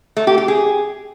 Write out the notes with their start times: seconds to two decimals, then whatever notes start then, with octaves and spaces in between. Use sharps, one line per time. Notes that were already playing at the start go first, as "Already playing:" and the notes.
0.17 A3
0.27 G4
0.38 G4
0.48 G#4